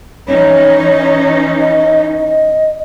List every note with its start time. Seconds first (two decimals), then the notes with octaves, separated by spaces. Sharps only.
0.28 E3 C#4 D#4 C#5
1.60 D#5
2.17 D#5